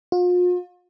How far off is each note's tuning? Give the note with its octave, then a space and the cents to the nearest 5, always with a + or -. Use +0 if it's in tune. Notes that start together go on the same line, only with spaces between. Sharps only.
F4 +40